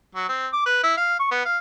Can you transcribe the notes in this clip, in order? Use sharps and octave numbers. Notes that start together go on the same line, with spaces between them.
F#3
C4
D6
B4
E4
F5
C#6
B3
F5